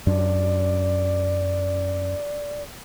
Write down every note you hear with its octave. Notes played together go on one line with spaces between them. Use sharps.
F#2 D4 D5